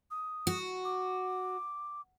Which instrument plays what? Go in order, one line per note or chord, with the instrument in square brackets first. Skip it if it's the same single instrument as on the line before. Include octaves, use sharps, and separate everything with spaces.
[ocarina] D#6
[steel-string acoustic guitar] F#4
[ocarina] D6